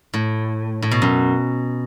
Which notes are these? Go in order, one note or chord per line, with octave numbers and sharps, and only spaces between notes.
A2
A2
B2
F#2